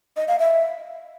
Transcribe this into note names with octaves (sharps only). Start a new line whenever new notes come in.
D#5
F5
E5